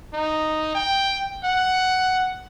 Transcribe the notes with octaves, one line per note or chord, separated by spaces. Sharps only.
D#4
G5
F#5